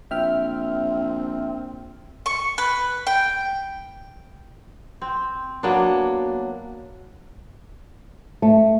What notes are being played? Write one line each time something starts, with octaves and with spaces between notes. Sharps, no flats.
A#1 C4 E5 G5 F6
C#6
B4
G5
C4
F#3 A#3 B3 D4
A3